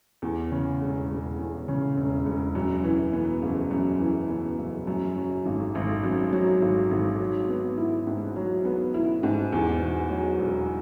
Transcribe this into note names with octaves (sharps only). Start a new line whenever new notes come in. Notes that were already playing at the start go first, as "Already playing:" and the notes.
E2
C#3
E1
E1
E2
C#3
E1
E1
F#2
E3
B3
F#1
F#2
E3
B3
F#1
F#2
F#3
G#1
G#1
F#2
F#3
G#1
G#1
F#3
B3
E4
G#2
F#3
B3
E4
G#2
E2
B2
F#3
E1